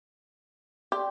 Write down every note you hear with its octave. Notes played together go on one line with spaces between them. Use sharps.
G4 D5 G5 C6